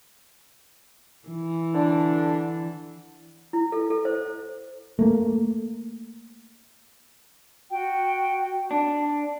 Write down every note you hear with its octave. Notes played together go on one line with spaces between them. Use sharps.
E3
D3 D4
E4
A4
A4
C5
A3 A#3
F#4 G5
D4